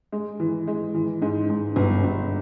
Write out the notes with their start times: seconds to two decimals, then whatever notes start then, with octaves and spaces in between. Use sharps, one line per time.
0.12 G#3
0.40 E3
0.67 G#3
0.95 E3
1.22 G#2
1.49 G#2
1.76 G1
2.04 G1